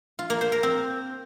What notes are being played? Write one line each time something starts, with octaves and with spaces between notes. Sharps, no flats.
F4
A#3
C5
A#4
C4